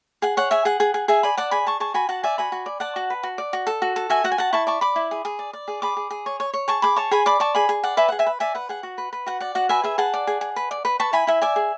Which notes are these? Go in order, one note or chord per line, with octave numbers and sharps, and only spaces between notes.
G#4 F#5
C#5 F#5
G#4 E5 G#5
G#4 F#5
G#4
G#4
G#4 E5 G#5
D5 G#5 B5
D5 F#5 A5
G#4 G#5 B5
G#4 A5 C#6
G#4 A5 C#6
F#4 G#5 B5
F#4 F#5 A5
D5 E5 G#5
F#4 G#5 B5
F#4
D5
D5 F#5 A5
F#4
B4
F#4
D5
F#4
A4
F#4
A4
F#4 E5 G#5
F#4 F#5
G#5
F#4 F#5 A5
E4 A5 C#6
D5 A5 C#6
D5 B5 D6
E4
G#4
G#4
D5
D5
G#4
G#4 B5 D6
G#4
G#4
C#5
C#5
C#5
G#4 A5 C#6
G#4 B5 D6
C#5 A5 C#6
G#4 G#5 B5
D5 B5 D6
D5 A5 C#6
G#4 G#5 B5
G#4
D5 F#5
B4 E5 G#5
G#4 F#5
E5 G#5
B4
D5 E5 G#5
B4 F#5
G#4 F#5
F#4
B4
B4
F#4 F#5
D5 F#5
F#4 F#5
B4 E5 G#5
G#4 E5 G#5
G#4 F#5 A5
D5
G#4
G#4
B4
D5
B4
B4 A5 C#6
E4 G#5 B5
E4 E5 G#5
D5 E5 G#5
G#4